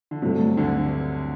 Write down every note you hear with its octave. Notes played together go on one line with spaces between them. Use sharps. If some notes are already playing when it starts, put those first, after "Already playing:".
D3
G2 C3 F#3 A3
D2 D3